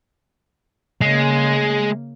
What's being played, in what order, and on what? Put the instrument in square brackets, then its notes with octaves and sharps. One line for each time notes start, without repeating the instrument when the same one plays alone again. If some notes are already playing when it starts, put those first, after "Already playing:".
[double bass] C#3 A#3 [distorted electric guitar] G#3